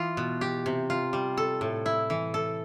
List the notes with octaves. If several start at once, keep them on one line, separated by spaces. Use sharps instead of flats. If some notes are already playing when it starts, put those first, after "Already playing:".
Already playing: E3 F4
B2
G4
C3
F4
G3
A4
A2
E4
E3
A4